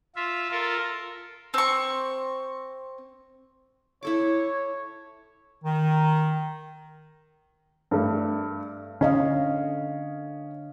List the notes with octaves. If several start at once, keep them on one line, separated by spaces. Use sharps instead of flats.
F4 E5
F4 A4 A#4
C4 C#6
E4 A4 C#5 D6
D#3
G2 A3
D3 C#4 D#5 F5